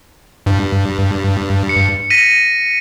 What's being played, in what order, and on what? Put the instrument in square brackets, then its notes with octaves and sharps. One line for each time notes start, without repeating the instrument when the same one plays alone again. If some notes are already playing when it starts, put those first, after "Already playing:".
[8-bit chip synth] G2
[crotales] C#7
A#6 B6 D#7